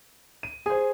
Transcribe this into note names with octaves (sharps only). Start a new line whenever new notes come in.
D#7
G#4 C5 G#5